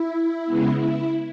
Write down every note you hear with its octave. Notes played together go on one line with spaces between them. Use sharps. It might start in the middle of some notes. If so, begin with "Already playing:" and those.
Already playing: E4
C#3 G#3 B3
E4